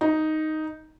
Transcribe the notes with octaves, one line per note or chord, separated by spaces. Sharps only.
D#4